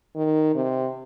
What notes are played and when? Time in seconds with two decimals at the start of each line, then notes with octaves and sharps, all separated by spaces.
0.16 D#3
0.55 C3